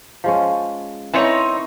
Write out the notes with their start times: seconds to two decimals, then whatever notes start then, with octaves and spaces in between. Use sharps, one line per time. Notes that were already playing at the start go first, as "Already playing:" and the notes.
0.24 F3 G#3 C#4
1.14 E3 C4 D#4 A#4 C#5 D#5